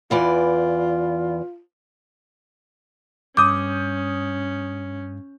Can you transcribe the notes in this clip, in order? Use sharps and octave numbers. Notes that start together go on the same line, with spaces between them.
E2 E3 F4 D5
G2 C#4 D6 D#6 G6